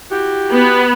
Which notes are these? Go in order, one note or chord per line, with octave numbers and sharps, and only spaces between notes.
E4 F#4 G4
B3